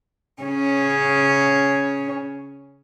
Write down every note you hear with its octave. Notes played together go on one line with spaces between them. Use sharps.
C#3 C#4